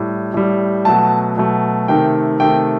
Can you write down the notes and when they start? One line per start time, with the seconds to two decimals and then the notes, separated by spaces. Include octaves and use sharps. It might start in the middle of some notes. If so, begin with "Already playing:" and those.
Already playing: A2 G3
0.34 A2 G3
0.85 B2 F#3 A3 A5
1.37 B2 F#3 A3
1.88 C3 D#3 A3 G5
2.40 C3 D#3 A3 G5